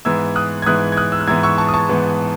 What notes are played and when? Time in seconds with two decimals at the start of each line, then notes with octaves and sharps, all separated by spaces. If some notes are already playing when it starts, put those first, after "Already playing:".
0.05 G#2 E3 B3 E6 G#6
0.36 D#6 F#6
0.62 G#6
0.66 G#2 E3 B3 D#6 F#6
0.92 G#6
0.97 D#6 F#6
1.12 E6
1.20 F#6
1.27 G#2 E3 B3 E6 G#6
1.43 C#6 E6
1.58 A5 C#6
1.69 D#6
1.74 A5 C#6
1.89 G#2 E3 B3